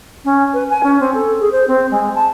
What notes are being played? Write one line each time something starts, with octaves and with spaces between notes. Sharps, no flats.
C#4
B4
G#5
C#4
C4
A4
G#4
C5
C4
G#3
A5